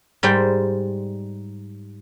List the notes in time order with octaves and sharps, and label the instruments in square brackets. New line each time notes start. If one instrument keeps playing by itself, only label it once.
[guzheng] G#2 G3 C5 G5